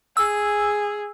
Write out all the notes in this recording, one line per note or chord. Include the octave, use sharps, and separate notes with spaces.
G#4 E6